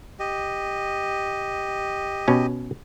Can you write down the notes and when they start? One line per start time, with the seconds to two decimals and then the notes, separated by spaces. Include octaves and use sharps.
0.19 G4 D#5
2.28 B2 C#4